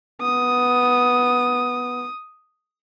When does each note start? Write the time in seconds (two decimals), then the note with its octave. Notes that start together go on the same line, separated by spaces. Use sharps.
0.22 B3 D#6